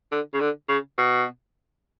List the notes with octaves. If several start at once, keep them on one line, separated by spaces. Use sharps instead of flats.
D3
C#3
D3
C#3
B2